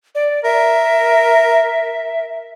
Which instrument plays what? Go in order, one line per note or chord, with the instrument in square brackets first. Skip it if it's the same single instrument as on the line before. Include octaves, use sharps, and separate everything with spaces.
[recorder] D5
[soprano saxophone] A#4 [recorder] E5